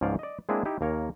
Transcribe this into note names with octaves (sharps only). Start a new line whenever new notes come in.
C#2 G#2 F3 C#5 D5 F5
D5 D#5
G#3 A#3 C4 D4 E4 G#4
D#4 E4 G4
D#2 A#3 A#4 C#5